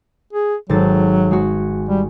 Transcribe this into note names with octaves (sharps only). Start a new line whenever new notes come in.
G#4
G#1 F#3 A4 A6
G#3 F#4
G3